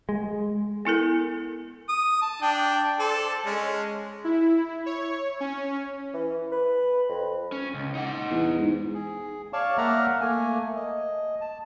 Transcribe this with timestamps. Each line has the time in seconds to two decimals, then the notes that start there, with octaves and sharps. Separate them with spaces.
0.09 G#3
0.85 B3 E4 A4 A#4
1.89 D#6
2.22 A5
2.42 D4 G5
2.99 A4 C5 D5
3.46 G#3 C#4
4.24 E4
4.86 C#5
5.40 C#4
6.14 E3
6.52 B4
7.09 F2
7.52 C#4
7.74 C#2
7.95 D#4 F#5
8.31 E2
8.59 G#2
8.94 G#4
9.53 C#5 D5 F5 A5 C#6 D6
9.78 A#3 E5 F#5 A#5 D6 F6
10.21 A3 A#3 G#5
10.76 D#5
11.41 A5